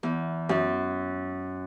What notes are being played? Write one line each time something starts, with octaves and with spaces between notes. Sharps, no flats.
E2
F#2